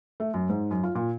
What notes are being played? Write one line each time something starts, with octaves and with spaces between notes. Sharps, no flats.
A3
F#2
G#2
F#2
F4
A#2